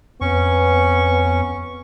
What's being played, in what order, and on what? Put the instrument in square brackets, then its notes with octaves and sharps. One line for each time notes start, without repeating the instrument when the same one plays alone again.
[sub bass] F2 [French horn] B3 [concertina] C#4 C#6